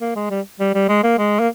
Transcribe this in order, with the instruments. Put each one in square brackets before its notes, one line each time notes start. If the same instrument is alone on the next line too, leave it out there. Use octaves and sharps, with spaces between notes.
[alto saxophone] A#3
G#3
G3
G3
G3
G#3
A#3
G#3
A#3